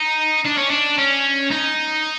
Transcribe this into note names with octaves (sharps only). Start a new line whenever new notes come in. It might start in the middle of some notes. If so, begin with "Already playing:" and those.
Already playing: D#4
D4
C#4
D4
C#4
D#4